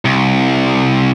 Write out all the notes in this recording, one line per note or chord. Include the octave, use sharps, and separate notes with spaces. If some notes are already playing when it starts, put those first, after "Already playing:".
C2